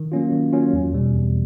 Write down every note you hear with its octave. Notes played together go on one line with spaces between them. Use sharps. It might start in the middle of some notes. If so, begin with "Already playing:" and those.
Already playing: D#3
F#3 A#3 C#4 F4
D#3
F#3 A#3 C#4 F4
E2
B2 G3
E2